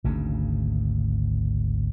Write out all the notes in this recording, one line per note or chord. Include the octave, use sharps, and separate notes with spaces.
G#1 D2 G#2 C#3